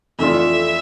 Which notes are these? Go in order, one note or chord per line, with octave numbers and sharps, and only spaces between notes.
F2 E3 A3 D4 F4 E5